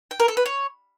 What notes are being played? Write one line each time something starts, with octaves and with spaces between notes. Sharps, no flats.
G5
A#4
A4
B4
C#5